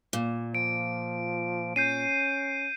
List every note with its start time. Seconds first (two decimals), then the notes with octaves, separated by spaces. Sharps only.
0.13 A#2
0.55 F3 D7
1.76 C#4 G6 C7 D#7